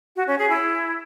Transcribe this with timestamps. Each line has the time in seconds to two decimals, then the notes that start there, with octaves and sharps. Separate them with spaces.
0.16 F#4
0.27 C#4
0.39 G#4
0.50 E4